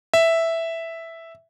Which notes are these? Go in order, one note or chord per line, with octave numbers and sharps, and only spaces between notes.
E5